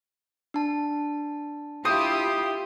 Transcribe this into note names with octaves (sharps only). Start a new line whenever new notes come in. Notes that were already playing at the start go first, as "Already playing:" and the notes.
D4 A5
E4 F4 G4 C5 D#6